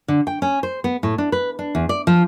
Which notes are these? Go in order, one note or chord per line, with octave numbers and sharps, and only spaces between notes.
D3
G5
C#4
C5
B3
A2
D4
B4
D4
E2
D5
F3